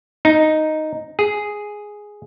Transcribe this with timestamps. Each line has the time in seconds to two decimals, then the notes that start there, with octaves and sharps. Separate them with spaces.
0.25 D#4
1.19 G#4